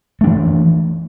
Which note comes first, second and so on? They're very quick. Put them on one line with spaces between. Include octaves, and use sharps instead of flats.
A3 D4 E3